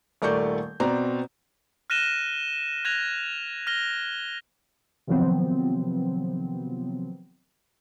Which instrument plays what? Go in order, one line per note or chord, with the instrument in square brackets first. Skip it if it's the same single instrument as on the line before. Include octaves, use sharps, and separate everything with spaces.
[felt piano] D#1 A3 A#4 D5 C#6 G6
B2 C4 D5 A#5
[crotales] F6 F#6 A#6 D#7 E7 G7
F#6 G#6 A#6 F7
F6 A#6 G7
[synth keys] C3 D#3 F3 F#3 B3 C4